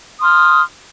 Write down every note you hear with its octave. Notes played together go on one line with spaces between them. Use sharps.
C6 D#6 F6